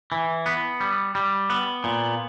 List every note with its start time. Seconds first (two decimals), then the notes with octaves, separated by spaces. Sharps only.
0.12 E3
0.46 B3
0.80 G3
1.15 G3
1.50 B3
1.84 A#2